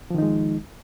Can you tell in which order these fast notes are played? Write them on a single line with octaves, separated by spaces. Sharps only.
F3 D#3 D#4 G#3